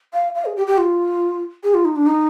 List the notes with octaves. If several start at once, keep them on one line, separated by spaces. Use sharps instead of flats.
F5
F5
G#4
G4
G4
F4
G#4
F4
D#4
D4
D#4